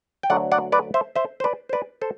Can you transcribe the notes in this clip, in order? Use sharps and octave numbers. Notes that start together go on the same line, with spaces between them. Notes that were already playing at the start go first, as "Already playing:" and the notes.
G5
D2 D3 F#3 D5 F#5
D5 F#5
B4 D5
C5 E5
C5 E5
C5
B4 D5
C5
B4 D5
A4 C5